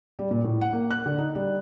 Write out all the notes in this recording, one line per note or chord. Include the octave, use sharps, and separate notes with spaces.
G3
A#2
A2
F#5
A#3
F#6
D3
D#4
G3